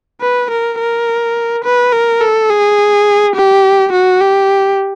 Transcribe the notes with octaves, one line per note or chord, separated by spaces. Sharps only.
B4
A#4
A#4
B4
A#4
A4
G#4
G4
F#4
G4